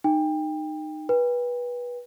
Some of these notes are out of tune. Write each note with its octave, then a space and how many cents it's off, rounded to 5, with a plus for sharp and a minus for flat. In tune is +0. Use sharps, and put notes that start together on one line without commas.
D#4 -20 G5 +25
B4 -20 G5 +35